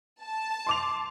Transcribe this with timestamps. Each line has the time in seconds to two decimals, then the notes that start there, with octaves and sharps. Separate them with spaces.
0.23 A5
0.67 C6 D6 F7